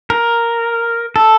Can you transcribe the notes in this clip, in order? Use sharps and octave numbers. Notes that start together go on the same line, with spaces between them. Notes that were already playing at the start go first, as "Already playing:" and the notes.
A#4
A4